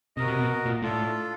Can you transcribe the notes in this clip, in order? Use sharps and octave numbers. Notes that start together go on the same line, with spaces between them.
C3 F#4 A#4 D#5
C3
B2
A#2
A2 D4 F4 A4